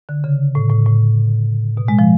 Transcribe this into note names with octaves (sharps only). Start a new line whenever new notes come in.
D3
C#3
A2
A2
A2
B2
G#3
F3